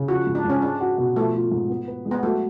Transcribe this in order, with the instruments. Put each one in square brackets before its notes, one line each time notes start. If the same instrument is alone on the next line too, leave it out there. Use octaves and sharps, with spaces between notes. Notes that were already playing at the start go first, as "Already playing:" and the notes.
Already playing: [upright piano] C#3
[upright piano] F3 [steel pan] F#4
[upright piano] G#2
[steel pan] D4
[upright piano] G#2 [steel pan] C#4
[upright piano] G#3 [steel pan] D4
[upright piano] F#4
B2
[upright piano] F3 [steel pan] A3
[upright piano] F4
G#2
B3
B4
G#3
[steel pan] B3
[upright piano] F#3 [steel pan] A3